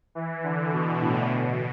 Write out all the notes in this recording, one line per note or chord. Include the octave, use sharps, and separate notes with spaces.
E3
D3
B2
A2
B2